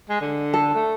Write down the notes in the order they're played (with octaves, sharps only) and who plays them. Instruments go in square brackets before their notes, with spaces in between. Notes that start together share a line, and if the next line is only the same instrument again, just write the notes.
[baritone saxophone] G#3
D3
[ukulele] A4
[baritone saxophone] A3